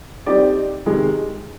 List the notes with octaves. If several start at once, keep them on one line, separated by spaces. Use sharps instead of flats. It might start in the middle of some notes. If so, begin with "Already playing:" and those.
G3 C4 D#4 G4 D5
C3 D#3 G#3